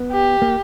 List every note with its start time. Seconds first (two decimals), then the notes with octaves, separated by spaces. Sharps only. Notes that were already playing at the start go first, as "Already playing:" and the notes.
Already playing: B3
0.12 G4
0.42 A#3